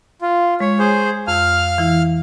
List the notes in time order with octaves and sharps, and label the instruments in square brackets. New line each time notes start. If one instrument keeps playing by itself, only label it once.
[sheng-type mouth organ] F4
[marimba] G#3 [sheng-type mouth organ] C#5
[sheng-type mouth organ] G#4 C5
[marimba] F2 E6 [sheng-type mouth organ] F5 F6
[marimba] E3 E4